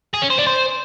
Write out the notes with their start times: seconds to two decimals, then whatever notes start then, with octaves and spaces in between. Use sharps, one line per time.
0.14 G#4
0.22 C#4
0.30 C5
0.38 D4
0.47 C5